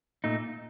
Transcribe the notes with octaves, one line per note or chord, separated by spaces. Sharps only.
A#2 A3 D#4